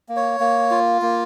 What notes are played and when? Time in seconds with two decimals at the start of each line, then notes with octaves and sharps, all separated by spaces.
0.09 A#3
0.16 C#5
0.40 A#3
0.71 F4
1.02 A#3